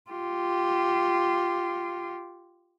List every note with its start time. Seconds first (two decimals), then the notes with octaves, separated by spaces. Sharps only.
0.11 F4 G4